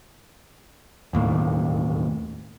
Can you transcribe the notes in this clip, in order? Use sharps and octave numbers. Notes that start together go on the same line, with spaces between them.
E1 D#2 A2